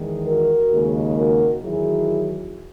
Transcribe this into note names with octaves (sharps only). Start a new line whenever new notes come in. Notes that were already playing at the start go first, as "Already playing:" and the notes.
Already playing: E2 D#3 G#3
F#4 A#4
D#2 C#3 G#3
F#4 A#4
E2 D#3 F#3 E4 G#4